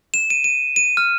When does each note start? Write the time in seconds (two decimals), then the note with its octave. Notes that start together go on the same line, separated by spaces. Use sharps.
0.14 E7
0.30 D#7
0.44 D#7
0.76 D#7
0.97 F6